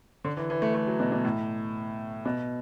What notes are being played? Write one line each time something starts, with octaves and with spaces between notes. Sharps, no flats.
D3
E3
E3
A3
A3
F#3
B2
B2
A2
B2